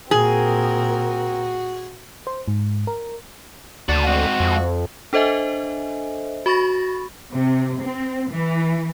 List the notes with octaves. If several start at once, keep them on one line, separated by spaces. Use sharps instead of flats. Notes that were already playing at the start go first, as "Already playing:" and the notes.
A#2 C4 F#4 G#4 A#4
C5
G#2
A#4
D2 F#4 D5 A5
G#3 C4 F#4
F2
D4 A4 C5 D#5 E5 G#5
F#4 B5 C#6 A6 A#6
C3
C4
E3